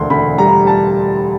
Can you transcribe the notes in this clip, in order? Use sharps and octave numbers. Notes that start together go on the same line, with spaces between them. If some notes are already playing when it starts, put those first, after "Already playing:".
Already playing: E1 D2 C6
D2 B5
G3 A#5
A5